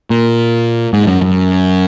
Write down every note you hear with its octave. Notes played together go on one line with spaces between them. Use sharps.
A#2
G#2
F#2
F#2